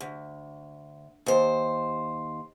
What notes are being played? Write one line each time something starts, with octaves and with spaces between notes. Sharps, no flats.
D2
D#2 C5